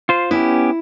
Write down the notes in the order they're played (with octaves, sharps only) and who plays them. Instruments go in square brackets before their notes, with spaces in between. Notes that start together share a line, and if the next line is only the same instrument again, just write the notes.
[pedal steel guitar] F4 C5
[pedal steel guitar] B3 C#4 G4 [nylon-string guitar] E4